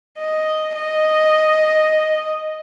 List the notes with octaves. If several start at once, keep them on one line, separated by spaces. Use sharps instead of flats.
D#5
D#5